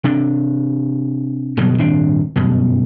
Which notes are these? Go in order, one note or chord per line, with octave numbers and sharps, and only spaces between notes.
C3 D4
G1 B2 F#3 G3
D#1 G#1 C4 D4
D1 G1 F#2 B2